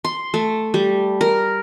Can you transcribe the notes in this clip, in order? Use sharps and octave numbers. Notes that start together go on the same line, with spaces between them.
C6
A3
G3
A#4